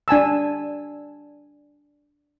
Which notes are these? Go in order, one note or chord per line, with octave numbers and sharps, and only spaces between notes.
D4 G#5 A5 E6